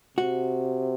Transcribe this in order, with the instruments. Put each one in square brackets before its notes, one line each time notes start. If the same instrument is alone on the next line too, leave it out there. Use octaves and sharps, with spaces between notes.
[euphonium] C3 [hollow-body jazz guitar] F#4